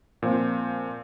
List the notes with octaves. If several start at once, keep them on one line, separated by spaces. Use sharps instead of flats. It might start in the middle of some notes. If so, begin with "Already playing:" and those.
A#2 F3 C4 C5 F5